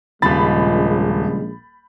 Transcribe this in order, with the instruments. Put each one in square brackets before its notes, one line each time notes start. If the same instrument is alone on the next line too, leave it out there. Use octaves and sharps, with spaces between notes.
[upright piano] D#1 A6 [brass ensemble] A#1 G#3 [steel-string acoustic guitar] C#3 G3 F4 [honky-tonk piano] B5